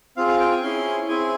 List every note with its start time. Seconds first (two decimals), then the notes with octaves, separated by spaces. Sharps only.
0.17 C4 F4 G#4 F5
0.28 F5
0.40 G5
0.52 G#5
0.63 C#4 E4 G#4 C6
1.08 C4 E4 G#4 G#5